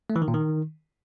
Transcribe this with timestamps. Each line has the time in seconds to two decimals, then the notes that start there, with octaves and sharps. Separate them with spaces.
0.10 A3
0.16 E3
0.22 D#3
0.28 A#2
0.34 D#3